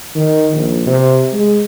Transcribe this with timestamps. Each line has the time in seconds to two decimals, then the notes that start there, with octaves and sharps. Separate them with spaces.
0.15 D#3
0.54 A#1
0.86 C3
1.33 G#3